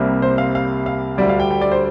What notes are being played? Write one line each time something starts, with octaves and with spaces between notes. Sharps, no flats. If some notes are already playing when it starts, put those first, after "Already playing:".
Already playing: C2 C3 G3 A#3
C5
F5
F5
F5
D2 D3 G3 D5
F5
G5
G5
D5
C5